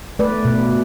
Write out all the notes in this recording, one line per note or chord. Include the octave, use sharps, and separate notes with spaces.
A3 B4 D5
B2